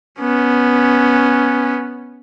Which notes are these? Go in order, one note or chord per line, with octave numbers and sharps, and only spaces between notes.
B3 C#4